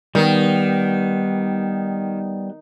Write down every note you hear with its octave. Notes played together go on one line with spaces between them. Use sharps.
D#3 G3 B3